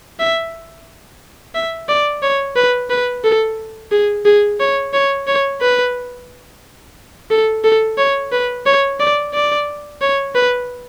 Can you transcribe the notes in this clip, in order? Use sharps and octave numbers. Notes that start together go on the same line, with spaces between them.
E5
E5
D5
C#5
B4
B4
A4
G#4
G#4
C#5
C#5
C#5
B4
A4
A4
C#5
B4
C#5
D5
D5
C#5
B4